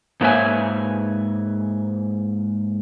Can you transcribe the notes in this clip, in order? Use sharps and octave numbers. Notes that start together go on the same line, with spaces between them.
G#2 A#3 B4 C#5 E5 G#5